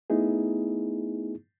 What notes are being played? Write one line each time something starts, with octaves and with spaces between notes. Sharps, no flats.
A3 B3 D#4 E4 G#4